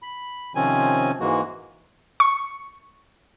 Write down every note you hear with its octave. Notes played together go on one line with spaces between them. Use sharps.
B5
C3 D#3 F3 C4 C#4 G#5
G#2 E3 G#3 A#3 F#4
C#6